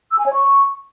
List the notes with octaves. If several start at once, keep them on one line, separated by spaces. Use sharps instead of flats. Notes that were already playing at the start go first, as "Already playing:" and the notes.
E6
G#5
C#5
C#6